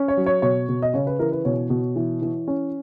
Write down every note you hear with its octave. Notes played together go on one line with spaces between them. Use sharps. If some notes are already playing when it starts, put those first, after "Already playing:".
Already playing: C#4
C#5
F#3
C#5
B2 C#5
B2
D#5
C#3 C#5
B4
E3 A#4
B4
B2 C#5
B2
E3
E3
C#4